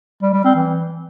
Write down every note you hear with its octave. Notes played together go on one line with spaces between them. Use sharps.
G3
G3
C4
E3